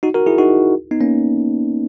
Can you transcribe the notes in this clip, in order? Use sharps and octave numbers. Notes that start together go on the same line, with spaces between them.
D#4 F#4
F#4 A#4
E4 G#4
D#4 F#4
B3 D#4
A#3 C#4